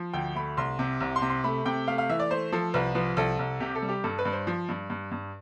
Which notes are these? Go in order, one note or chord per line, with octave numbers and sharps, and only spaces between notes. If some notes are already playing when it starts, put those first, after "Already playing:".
Already playing: F3
D2 G5
A3 B5
C2 C6
C3
C2
C6
C3
C6
A3 B5
C3 G5
A3 F5
F5
E3 E5
D5
A3 C5
F3 A4
C2 B4
F3 B4
C2 A4
C2
C3 G4
A4
G3
G4
G2 A4
B4
G2
C5
F3
G2
G2
G2